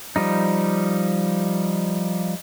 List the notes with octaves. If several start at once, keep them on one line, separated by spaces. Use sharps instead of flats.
F3 G3 D#4